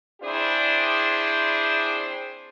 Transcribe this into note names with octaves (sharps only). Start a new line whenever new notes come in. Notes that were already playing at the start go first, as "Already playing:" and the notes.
C4 D4 E4 G#4 C5